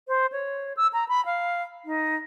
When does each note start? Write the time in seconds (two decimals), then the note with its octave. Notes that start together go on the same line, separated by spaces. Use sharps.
0.08 C5
0.32 C#5
0.77 E6
0.93 A#5
1.09 B5
1.26 F5
1.85 D#4